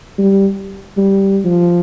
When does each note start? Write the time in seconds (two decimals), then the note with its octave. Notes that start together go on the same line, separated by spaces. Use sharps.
0.18 G3
0.97 G3
1.45 F3